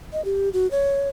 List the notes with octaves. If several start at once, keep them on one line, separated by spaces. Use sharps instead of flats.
D#5
G4
F#4
C#5